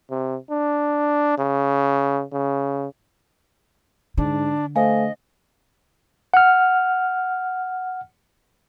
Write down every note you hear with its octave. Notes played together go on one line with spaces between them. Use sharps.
C3
D4
C#3
C#3
G#2 D3 D4
A3 C5 D#5 F5 G#5
F#5 F6